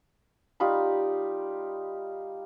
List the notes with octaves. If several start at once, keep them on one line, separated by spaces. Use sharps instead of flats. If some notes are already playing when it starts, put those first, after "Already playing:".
G3 D#4 F4 B5